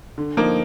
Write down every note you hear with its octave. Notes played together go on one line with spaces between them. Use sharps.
D3
F3 A#3 D#4 A#4